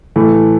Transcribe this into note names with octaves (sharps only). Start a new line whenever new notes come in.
A2 E3 A3